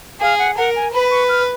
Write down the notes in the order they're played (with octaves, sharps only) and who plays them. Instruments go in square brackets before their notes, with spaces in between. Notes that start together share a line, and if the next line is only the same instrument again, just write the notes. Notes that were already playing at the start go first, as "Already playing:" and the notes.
[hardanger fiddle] G#4 [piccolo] F5
[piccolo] F#5
[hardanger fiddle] A#4 [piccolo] F#5
[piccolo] G#5
[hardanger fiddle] B4 [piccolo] B5
[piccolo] C#6
F6